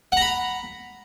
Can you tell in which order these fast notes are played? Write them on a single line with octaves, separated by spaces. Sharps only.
F#5 A#5 B5